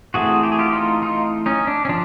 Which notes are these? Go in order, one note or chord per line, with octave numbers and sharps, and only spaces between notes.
E3 A3 C4 F#4 G#4
G4
G#4
F4 G4
D#4 F4
D#4 F4
C#4 D#4
D4
C#4
F3 D4